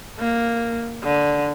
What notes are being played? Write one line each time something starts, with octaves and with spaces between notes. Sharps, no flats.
A#3
D3